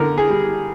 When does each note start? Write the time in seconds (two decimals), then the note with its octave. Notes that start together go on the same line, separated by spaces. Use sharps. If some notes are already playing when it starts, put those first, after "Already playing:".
Already playing: D3 A#4
0.18 G#4
0.29 G3